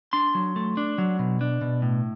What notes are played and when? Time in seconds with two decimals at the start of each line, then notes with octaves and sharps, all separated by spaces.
0.13 D4 C6
0.35 F#3
0.56 A3
0.77 D4
0.98 F#3
1.19 B2
1.41 D4
1.62 B2
1.82 A2